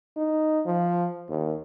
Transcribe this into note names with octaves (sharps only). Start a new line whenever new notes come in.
D#4
F3
D#2